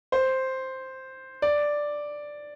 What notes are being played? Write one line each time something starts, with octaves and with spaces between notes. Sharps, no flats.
C5
D5